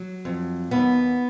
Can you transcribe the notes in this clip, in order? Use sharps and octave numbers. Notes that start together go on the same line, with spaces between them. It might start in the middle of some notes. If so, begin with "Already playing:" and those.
Already playing: F#3
F2
D#2 B3